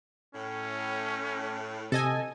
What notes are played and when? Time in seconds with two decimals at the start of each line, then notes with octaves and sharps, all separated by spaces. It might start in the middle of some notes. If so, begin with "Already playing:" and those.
0.35 A2 C#4
1.92 C3 A4 D#5 G#5